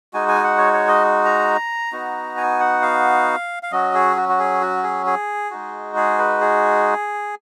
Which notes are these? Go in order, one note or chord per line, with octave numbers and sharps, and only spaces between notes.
G#3 D#4 F#4 G#5
G#5
F#5
C#5
C#5
D#5
A#5
B3 D#4 F#4
G#5
F#5
F5
F5
F#3 C#4 F#4 D#5
G#4
F#4
F#4
G#4
F#4
G#4
G#4
G#3 D#4 F#4
G#4
B4
G#4